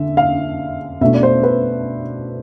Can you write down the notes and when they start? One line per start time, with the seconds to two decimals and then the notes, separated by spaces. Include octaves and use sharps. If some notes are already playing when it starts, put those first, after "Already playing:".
Already playing: D3 E5
0.17 F5
1.01 B2 A3 D4 E5
1.14 D5
1.23 C5
1.43 B4